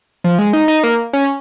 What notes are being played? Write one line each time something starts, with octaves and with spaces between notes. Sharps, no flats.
F3
G#3
D#4
D#4
A#3
C#4